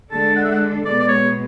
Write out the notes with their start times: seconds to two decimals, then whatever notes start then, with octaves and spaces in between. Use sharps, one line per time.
0.11 D3 G#3 D4 A4 A5
0.36 F#5
0.44 E5
0.51 F#5
0.85 B2 G#3 B3 D5
1.00 D5
1.08 C#5